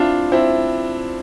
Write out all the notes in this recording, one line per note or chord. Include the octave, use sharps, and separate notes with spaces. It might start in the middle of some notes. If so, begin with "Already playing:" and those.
Already playing: C4 D4 E4 F4
C4 E4